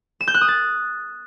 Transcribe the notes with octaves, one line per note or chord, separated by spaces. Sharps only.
E7
G6
F#6
D#6
A6